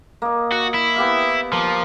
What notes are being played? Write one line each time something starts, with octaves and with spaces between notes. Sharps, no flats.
A#3 D#5
F#4
E4
B3 G4 F5
F3 A#3